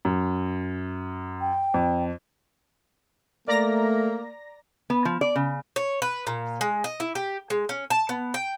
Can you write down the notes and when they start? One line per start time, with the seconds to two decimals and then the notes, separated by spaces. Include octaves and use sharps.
0.05 F#2
1.41 G5
1.74 F2
3.48 A3 A#3 D5 A#5 A#6
4.90 B3
5.05 F3
5.21 D5
5.36 C#3
5.76 C#5
6.02 B4
6.27 A#2
6.61 G#3
6.84 D#5
7.00 E4
7.15 G4
7.50 G#3
7.69 C#4
7.90 A5
8.09 B3
8.34 G5